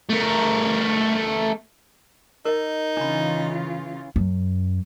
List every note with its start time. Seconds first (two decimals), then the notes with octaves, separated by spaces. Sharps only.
0.09 A3 A#4
2.45 D#4 A#4 D#5
2.97 C#3 E3 D4 F4 B5
4.16 F#2